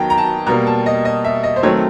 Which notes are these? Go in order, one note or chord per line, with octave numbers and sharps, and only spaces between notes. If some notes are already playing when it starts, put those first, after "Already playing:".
Already playing: D#3 F#3 B3 G5 A5 A#5
A#5
A5
B2 G3 A#3 A#5
A5
D#5
D#5
E5
D#5
C5
D#3 F#3 A3 C4 C#5